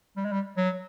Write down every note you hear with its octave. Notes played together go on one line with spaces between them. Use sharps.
G3
G#3
G3
F#3